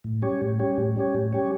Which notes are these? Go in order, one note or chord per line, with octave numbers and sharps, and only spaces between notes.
A2
G3 C#4 G4 C#5
A2
G3 C#4 G4 C#5
A2
G3 C#4 G4 C#5
A2
G3 C#4 G4 C#5